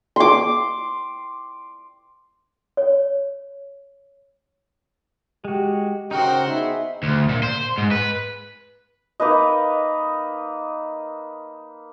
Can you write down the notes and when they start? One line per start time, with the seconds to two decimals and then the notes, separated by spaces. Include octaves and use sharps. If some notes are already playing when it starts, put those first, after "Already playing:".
0.16 C6 D6
2.77 C#5
5.45 G#3 F#4 G4
6.11 C#3 D#4 F#4 A#4 C5 G5 C6
6.47 B3 D#4 G#4 E5
7.03 D2
7.29 A#2
7.43 C5
7.78 G#2
7.91 B4
9.20 A#3 D#4 B4 D#5